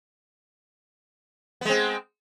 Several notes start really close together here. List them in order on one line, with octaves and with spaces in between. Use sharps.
B3 G#3 C4